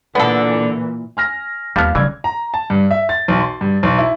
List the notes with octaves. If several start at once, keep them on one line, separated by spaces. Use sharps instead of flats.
A#2 D3 E3 B3 A4
G#5 F6 A#6
D#2 G3 B3 F5 A5 F6
C#3 E3 F#3 D5 G#6
A#5
A5
G2
E5
A6
B1
C6
G2
B1
E4